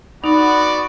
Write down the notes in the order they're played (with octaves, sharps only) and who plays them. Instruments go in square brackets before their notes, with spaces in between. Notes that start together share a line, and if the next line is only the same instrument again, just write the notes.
[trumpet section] B3 F#4 D5 [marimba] D#4 [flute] B5